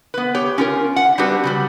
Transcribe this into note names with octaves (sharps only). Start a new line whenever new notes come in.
B3 B4
G4 C#5
C#4 F4 A#4
F#5
G3 C4 D4 F#4 G4 B4
C#3 F#3 G3